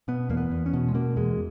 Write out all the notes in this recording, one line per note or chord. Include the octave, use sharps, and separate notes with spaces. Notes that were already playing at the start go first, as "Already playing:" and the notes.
B2 B3
E2 A#3
B3
E2
C#4
B2
G#3
B2 A#3
E2 G#3